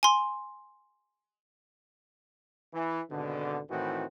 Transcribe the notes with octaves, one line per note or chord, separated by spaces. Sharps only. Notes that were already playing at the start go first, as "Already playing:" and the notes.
G#5 C6
E3
G#1 B2 D3
A2 D#3 E3 C4 F#4